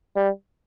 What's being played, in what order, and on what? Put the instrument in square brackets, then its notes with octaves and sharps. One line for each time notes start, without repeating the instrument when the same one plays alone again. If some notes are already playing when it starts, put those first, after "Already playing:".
[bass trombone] G3